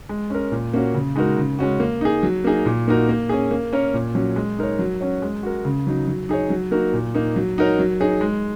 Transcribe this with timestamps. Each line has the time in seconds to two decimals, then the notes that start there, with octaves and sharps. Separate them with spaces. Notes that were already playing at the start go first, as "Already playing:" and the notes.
0.09 G#3
0.30 C#4 A#4
0.52 A#2
0.73 A#3 C#4 F#4 C#5
0.94 C#3
1.16 G#3 D#4 F#4 A#4
1.38 C#3
1.59 G#3 C#4 F#4
1.80 A#3
2.01 D#4 G#4
2.23 F#3
2.44 A#3 D#4 G#4
2.66 A#2
2.87 A#3 D#4 F#4 A#4
3.09 A#3
3.29 C#4 G#4
3.51 A#3
3.73 C#4 A#4 C#5
3.94 A#2
4.15 F#3 C#4
4.36 G#3
4.58 D#4 A#4 C#5
4.79 F#3
5.00 C#4 F#4 C#5
5.22 G#3
5.43 F#4 A#4
5.65 C#3
5.87 F#3 D#4
6.07 F#3
6.29 D#4 G#4 C#5
6.50 F#3
6.71 A#3 D#4 F#4 A#4
6.93 A#2
7.14 A#3 D#4
7.36 F#3
7.58 D#4 F#4 A#4 C#5
7.79 F#3
8.00 D#4 G#4 C#5
8.21 G#3